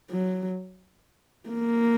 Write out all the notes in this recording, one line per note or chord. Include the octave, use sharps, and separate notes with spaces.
F#3
A#3